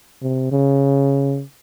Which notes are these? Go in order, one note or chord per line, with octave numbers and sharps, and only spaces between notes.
C3
C#3